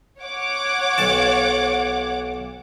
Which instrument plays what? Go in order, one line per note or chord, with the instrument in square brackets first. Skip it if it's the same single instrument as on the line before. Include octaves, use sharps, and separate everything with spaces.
[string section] C#5 F#5 D6
[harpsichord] B1 A5